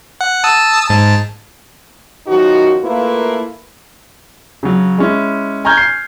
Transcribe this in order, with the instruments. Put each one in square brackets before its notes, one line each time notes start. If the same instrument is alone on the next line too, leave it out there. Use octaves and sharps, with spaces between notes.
[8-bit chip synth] F#5
A5 D#6 E6
G#2 A5
[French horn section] F#2 D#3 F3 D#4 F#4
A3 A#3 E4 F4 A#4 B4
[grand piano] C#3 F#3
G#3 C#4 E4
G#5 A#5 C#6 F6 G6 G#6
C7